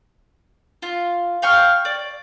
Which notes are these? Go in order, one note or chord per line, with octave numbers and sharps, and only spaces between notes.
F4
F5 G5 C#6 F6
D5